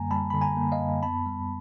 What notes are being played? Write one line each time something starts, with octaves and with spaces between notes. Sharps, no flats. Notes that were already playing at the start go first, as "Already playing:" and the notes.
Already playing: F#2 D3 G3 A#3 G#5 A#5
G3 A5 B5
D3 B5
G#5 A#5
A#3
D#5 F5
F#2
B3 A5 B5
G3